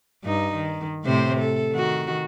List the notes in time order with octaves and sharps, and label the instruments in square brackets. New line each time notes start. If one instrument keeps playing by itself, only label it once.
[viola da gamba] G2 D#4
D#3
A2 C3 C5
A4
D#3 F#4